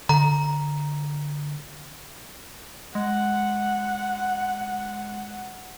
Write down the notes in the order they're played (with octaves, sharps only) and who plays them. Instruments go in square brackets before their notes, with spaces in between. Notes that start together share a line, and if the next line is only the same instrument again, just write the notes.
[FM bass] D3 [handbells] A#5
[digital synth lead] G#3 [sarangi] F#5